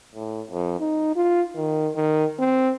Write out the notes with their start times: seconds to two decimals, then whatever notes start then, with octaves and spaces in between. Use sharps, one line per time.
0.14 A2
0.51 F2
0.80 D#4
1.16 F4
1.56 D#3
1.95 D#3
2.39 C4